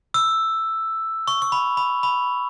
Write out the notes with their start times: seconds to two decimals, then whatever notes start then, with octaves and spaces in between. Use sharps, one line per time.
0.14 E6
1.28 C#6
1.42 C#6
1.52 B5
1.77 B5
2.03 B5